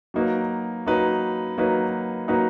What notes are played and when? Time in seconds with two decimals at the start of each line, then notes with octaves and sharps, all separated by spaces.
0.14 F#3 A#3 D#4 F#4 B4
0.86 F#3 A#3 D#4 F#4 B4
1.58 F#3 A#3 D#4 F#4 B4
2.28 F#3 A#3 D#4 F#4 B4